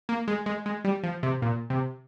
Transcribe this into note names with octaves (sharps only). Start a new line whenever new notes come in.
A#3
G#3
G#3
G#3
G3
F3
C3
A#2
C3